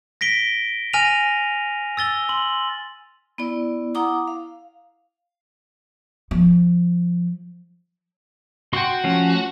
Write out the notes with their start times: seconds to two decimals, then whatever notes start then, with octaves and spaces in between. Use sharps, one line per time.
0.21 A#6 B6 D7 G7
0.93 G#5 F6 A#6 D#7 F7
1.97 E6 A6 G7
2.29 C6 F#7
3.38 B3 E4 D5
3.95 E4 F#5 A#5 D6 D#6
4.28 F5
6.31 F3
8.73 F#4 G5 C6
9.04 F3 A3 C#4